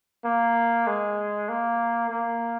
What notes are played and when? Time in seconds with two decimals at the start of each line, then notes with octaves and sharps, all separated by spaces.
0.25 A#3
0.87 G#3
1.49 A#3
2.10 A#3